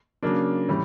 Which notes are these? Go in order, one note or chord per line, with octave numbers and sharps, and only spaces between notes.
C#3 F#3 A#3 D4
A2 E3 G3